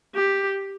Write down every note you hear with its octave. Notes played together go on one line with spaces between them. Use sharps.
G4